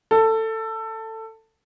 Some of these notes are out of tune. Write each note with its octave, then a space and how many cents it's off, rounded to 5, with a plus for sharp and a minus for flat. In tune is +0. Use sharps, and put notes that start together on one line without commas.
A4 +15